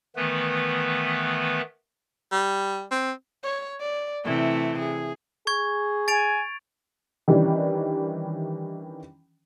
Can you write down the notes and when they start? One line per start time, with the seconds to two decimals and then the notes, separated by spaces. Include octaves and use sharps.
0.16 D#3 E3 A3 B3 B4
2.32 G3
2.91 C4
3.44 C#5
3.81 D5
4.25 C3 E3 A3
4.79 G#4
5.47 G#4 C#6 G#6
6.08 G#5 A6 D7 F7
7.28 D#3 E3 G3 C#4 D4